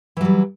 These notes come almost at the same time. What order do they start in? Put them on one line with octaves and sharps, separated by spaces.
E3 F#3 G3